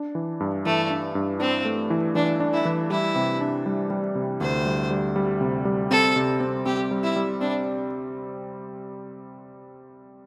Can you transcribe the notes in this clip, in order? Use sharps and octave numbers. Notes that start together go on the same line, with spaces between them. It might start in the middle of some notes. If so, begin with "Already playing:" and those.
Already playing: D4
E3
G2
E3 A3
D4
G2
C4 D4
A3
E3
E3 D4
D4
E4
E3
G3 E4
C3
D4
G3
G3
C3
D2 C5
G3
G3
G3
C3
G3
C4 A4
C3
C4
C4 G4
G3
E4
G3
C4 D4